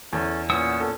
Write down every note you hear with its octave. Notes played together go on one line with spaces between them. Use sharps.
E2 C#4 A4
A#2 B3 C#4 F#5 D#6 E6
A4